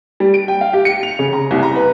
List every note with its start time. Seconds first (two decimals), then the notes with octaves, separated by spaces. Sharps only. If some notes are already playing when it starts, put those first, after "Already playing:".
0.20 G3
0.34 D7
0.48 G5
0.61 F5
0.73 G4
0.85 C#7
1.03 F7
1.19 C#3
1.33 A#5
1.51 C2
1.63 A#5
1.75 B4